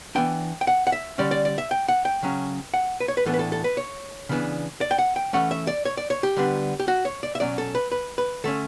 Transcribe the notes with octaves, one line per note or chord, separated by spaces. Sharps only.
E3 B3 D4 G5
G5
F#5
F#5
E5
D3 G3 C#4 D5
D5
D5
E5
G5
F#5
G5
C#3 F#3 C#4
F#5
B4
C#5
B4
A2 E3 B3 D4 A4
B4
A4
A4
B4
C#5
C#3 E3 B3 D4
D5
G5
F#5
G5
E3 A3 C#4 F#5
E5
D5
C#5
D5
C#5
G4
D3 G3 B3 D4
G4
F#4
C#5
D5
E5
B2 F#3 C#4 D5
A4
B4
B4
B4
D3 A3 C#4 A4